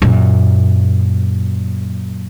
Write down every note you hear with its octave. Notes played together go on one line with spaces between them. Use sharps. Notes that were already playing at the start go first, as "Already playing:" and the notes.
F#2 A#2